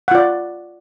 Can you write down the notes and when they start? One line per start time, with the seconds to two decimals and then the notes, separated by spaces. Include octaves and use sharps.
0.08 F#5
0.11 F4
0.15 D5